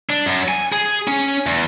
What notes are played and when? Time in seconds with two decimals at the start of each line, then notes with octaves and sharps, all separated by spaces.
0.10 D4
0.26 F#2
0.48 G#5
0.72 G#4
1.08 C#4
1.46 E2